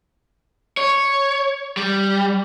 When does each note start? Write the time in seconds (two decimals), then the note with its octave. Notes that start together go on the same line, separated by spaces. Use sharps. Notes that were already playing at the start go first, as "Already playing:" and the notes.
0.77 C#5
1.77 G3